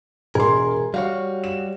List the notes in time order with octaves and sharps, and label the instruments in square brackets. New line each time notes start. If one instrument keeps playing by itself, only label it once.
[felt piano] E1 C6 [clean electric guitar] G#4 A#4
[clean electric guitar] G3 F#4 C#5 [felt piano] F5
[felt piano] E7